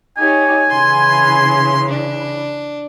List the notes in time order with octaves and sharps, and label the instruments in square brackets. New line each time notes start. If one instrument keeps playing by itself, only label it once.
[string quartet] D#4 G4 C#5 [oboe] G#5
[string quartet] C#3 E3 [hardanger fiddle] C6
[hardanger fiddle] D4